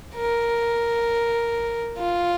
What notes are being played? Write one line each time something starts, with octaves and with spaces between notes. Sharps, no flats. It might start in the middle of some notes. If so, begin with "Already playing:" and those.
A#4
F4